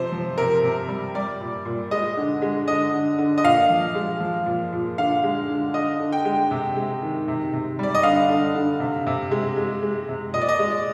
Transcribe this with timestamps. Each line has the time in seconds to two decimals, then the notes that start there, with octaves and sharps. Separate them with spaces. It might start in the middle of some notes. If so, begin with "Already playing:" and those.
Already playing: C3 F3 C5
0.12 F3
0.38 C3 A#4
0.64 C3
0.89 G3
1.15 G3 D5
1.41 A#2
1.65 A#2
1.91 G#3 D#5
2.17 D3
2.42 G#3
2.68 D3 D#5
2.94 D3
3.18 D3
3.38 D#5
3.44 A#2 F5
3.70 F3
3.95 G#3
4.20 F3
4.46 A#2
4.73 A#2
4.98 D3 F5
5.23 G#3
5.49 D3
5.74 D3 D#5
6.00 D3
6.13 G5
6.25 G#3
6.51 C3
6.76 G#3
7.02 D#3
7.28 C3
7.53 C3
7.79 G3 D5
7.95 D#5
8.03 D3 F5
8.29 D3
8.55 D3
8.80 C3
9.07 C3
9.31 G#3
9.57 G#3
9.83 G#3
10.09 C3
10.34 A#2 D#5
10.41 D5
10.49 D#5
10.59 G#3
10.72 D5